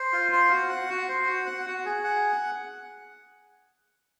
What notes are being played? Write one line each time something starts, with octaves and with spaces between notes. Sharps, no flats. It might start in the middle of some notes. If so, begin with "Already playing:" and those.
Already playing: C5
F4
C5
F#4
F#5
F#4
C5
F#4
F#5
F#4
G#4
F#5